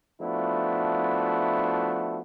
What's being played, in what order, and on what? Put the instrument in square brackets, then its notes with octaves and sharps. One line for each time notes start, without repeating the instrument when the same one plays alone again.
[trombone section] F3 A3 B3 D4 E4 F#4